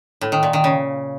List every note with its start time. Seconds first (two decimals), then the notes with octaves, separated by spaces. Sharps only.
0.21 A2
0.32 D#3
0.43 A#2
0.53 D#3
0.64 C#3